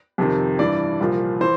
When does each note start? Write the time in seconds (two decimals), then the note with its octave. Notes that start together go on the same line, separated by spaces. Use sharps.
0.18 F2 C3 D#3
0.59 G2 E3 D5
1.00 C2 A#2 F3
1.41 E3 C5